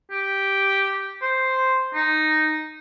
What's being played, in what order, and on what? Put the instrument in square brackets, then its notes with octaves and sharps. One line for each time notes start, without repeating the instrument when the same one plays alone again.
[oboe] G4
C5
D#4